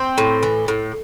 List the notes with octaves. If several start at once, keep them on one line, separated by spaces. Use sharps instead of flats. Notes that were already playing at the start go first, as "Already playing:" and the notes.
Already playing: C4
A2
E3
A2